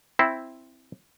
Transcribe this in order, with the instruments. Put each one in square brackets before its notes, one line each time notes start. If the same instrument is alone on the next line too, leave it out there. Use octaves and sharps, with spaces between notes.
[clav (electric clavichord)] C4 E4 C5